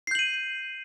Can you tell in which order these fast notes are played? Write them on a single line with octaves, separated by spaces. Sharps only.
C7 G6 F#7 D#7